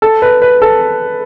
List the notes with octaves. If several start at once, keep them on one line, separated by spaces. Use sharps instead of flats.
A4
B4
B4
A4